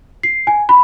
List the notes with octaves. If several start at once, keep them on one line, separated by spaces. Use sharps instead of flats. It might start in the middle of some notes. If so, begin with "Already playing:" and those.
C7
G#5
B5